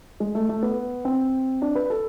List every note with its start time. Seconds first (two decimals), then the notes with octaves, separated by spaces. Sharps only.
0.20 G#3
0.35 A3
0.49 A3
0.63 B3
1.05 C4
1.62 D4
1.75 B4
1.90 A4